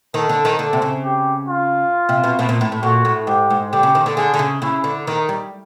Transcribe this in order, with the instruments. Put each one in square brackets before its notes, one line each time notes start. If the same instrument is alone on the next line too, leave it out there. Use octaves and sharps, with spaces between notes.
[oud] D#3 [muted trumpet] A4
[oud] D3
D#3
[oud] D3 [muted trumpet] A4
[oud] C3
C#3
[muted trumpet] G4
F4
[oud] C3
B2
B2
A#2
A2
A2
[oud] A#2 [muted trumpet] F#4
[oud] A2
[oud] G#2 [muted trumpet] G4
[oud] G#2
[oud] D3 [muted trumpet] G4
[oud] C#3
D#3
D3
[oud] D3 [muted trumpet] G#4
[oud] D3
C#3
[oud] C#3 [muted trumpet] E4
[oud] D3
[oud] D#3 [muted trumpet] D#4
[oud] G3